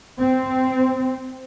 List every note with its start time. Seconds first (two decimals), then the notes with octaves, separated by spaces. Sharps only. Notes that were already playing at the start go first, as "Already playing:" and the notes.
0.20 C4